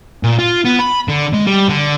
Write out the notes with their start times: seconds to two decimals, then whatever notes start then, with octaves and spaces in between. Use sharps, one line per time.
0.24 A#2
0.39 F4
0.65 B3
0.80 B5
1.09 D3
1.34 G#3
1.47 G3
1.69 D3